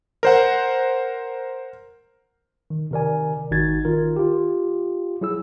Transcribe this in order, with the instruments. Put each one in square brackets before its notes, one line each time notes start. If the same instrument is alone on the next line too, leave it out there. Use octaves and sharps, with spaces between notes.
[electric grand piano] A#4 C5 F#5
[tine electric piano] D#3
C3 D#3 A#4 D5 G#5
G#1 D#3 D#4 F#4 G#6 A6
D#3 F4 A#4
F4 G4
F#3 E4 G#4 E6